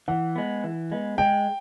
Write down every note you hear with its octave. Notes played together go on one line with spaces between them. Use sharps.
E3 F#5
G#3 B3
E3
G#3 B3
G#3 G5